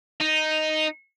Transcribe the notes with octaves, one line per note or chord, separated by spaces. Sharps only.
D#4